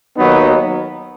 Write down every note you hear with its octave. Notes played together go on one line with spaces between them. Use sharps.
D#2 D#3 F#3 B3 D#4